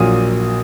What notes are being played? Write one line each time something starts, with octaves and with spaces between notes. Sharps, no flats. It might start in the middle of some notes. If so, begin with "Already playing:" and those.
Already playing: A#1 A#2 F#3 A#3 D#6